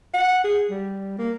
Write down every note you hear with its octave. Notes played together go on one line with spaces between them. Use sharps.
F#5
G#4
G3
A#3